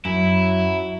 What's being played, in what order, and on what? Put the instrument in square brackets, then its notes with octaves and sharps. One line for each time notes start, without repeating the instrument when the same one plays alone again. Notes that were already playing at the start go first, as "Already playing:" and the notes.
[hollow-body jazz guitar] F#2 [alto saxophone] F#3 [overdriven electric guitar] E4